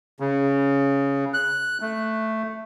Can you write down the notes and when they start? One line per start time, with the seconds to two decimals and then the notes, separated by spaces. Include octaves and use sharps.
0.20 C#3
1.34 F#6
1.81 A3